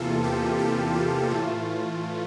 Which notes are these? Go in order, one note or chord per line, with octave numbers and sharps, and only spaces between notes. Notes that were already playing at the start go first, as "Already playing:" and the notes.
Already playing: E2 C3 E3 A#3 F4 A4
G4
G4
F4
A2 E3 A3 F4